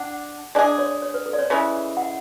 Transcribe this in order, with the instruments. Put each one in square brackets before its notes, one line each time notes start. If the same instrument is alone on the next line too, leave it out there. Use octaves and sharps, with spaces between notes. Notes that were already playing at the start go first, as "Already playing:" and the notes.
Already playing: [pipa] D4 [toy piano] F#5
[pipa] G#3 D4 G#4 [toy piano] D5
[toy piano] C#5
C#5
B4
A4
D5
C#5
[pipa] C#3 E3 G#3
[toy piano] F#5